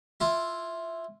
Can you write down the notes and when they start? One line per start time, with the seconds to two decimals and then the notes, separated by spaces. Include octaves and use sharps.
0.20 E4 F4